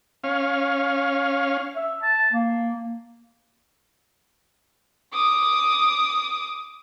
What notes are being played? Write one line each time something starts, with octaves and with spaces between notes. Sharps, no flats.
C#4 F5
E5
A5
A#3
D6 D#6